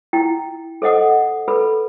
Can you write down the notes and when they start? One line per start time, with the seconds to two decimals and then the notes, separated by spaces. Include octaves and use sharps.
0.13 E4 G5
0.82 A4 C5 D#5 F#5 D#6
1.48 A4 B4 B5